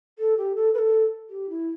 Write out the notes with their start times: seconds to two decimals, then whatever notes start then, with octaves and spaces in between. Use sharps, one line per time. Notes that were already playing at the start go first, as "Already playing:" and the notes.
0.19 A4
0.37 G4
0.56 A4
0.74 B4
0.79 A4
1.30 G4
1.49 E4